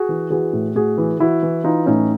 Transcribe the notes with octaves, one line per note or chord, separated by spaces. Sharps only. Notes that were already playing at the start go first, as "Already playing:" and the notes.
Already playing: F#4 G#4
E3
E3 F#4 G#4
A2
A2 F#4 G#4
E3
E3 E4 F#4
E3
E3 D#4 F4
A2 C#4 D#4